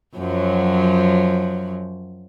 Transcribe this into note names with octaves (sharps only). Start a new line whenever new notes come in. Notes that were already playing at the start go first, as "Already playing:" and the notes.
F#2 F3 F#3